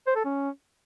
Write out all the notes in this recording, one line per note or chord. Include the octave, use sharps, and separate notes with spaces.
C5
A4
C#4